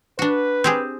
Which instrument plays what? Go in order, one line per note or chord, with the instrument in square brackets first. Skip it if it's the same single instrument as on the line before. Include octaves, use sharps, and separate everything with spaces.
[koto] D4 F#4 [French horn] B4
[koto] C4 G4 G#4